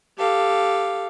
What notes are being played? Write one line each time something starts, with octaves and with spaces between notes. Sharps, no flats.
G4 A4 F5